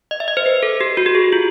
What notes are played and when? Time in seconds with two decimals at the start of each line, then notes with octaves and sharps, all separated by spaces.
0.11 D#5
0.20 E5
0.28 D#5
0.37 C5
0.46 B4
0.63 A4
0.81 G4
0.97 F#4
1.06 G4
1.15 G#4
1.33 F4